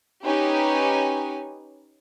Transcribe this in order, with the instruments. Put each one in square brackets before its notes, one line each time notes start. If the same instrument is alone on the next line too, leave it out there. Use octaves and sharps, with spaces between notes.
[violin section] C#4 D#4 G4 B4 C#5 G#5